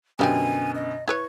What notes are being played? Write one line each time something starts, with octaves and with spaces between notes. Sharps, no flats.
F#2 B2 D3 F3 G3 C4 G#5
D#5
E4 B4 C#5 C#6 G#6